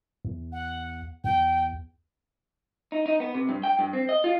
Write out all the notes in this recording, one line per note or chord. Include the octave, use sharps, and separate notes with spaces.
E2
F#5
E2 G5
D#4
D#4
B3
C3
G2
G5
G2
C4
D#5
F4